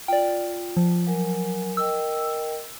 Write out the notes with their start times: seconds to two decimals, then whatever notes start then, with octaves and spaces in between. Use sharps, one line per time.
0.08 F4 D5 G5
0.77 F3
1.07 F#3 A#4 G#5
1.77 A#4 D#5 G5 E6